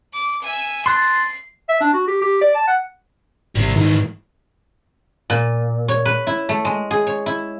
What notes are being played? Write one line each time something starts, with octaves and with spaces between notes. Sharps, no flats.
D6
E5 G#5
A5 C6 F#6 C7
E5
D4
F#4
G4
G4
D5
A5
F#5
G#1 C3 G3
G#2 D#3 E3
A#2
C#5
B4
E4
A3
G#3
G#4
C#5
E4